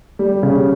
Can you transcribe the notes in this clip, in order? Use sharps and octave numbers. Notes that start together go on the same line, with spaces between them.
G3
C#3